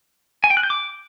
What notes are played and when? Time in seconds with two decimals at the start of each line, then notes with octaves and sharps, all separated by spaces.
0.44 G#5
0.50 G5
0.57 F#6
0.63 G6
0.70 D6